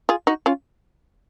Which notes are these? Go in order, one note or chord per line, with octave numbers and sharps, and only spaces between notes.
F4 G#4
D#4 F#4
C#4 F4